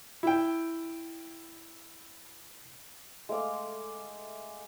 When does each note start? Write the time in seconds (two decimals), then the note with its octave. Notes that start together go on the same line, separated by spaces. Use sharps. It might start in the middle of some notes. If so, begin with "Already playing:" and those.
0.23 E4 G5
3.29 G#3 A3 F5 D6